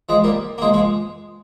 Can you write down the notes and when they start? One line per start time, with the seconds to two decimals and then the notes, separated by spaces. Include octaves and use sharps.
0.09 F3 G#3
0.24 G3 A#3
0.58 A#3
0.62 F3 G#3
0.74 F3 G#3